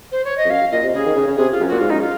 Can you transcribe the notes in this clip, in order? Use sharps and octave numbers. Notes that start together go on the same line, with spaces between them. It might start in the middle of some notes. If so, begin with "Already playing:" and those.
C5
C#5
D#5
F2
F#2 F5
A#2 D#5
C3
C#3 G#4
D#3
C#3
C#3
C3 G#4
F4
F#2
A#2 F#4
G#2 F4
F#2 D#4
F4